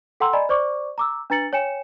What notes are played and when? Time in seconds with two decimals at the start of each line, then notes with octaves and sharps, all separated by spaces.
0.20 A4 F#5 G5 A#5 C6 E6
0.33 D5 D#5 G#5 A#5 B5
0.49 C5 D5 C#6 D6
0.98 A#5 D6 E6
1.30 D4 B4 A#5 A6 C#7 F#7
1.53 C#5 G5 G#5 C#7 E7